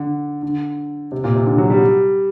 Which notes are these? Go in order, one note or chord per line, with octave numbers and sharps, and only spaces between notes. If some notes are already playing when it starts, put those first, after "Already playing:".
Already playing: D3
D3
C3
A#2
C3
D3
F#3
G3